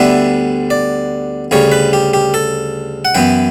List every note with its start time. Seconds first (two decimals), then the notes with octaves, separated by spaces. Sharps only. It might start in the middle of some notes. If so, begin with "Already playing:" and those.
Already playing: D2 D3 G3 B3 D4 E5
0.70 D5
1.51 D2 C#3 G3 C#5
1.72 B4
1.93 G4
2.13 G4
2.34 A4
3.05 F#5
3.15 F#2 E3 B3 G5